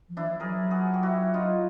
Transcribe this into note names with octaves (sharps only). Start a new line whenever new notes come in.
F3
E3 D4 E4
F3
F#3 G#4 A#4
F#4 G#4
G4
E4 F#4
D#4 F4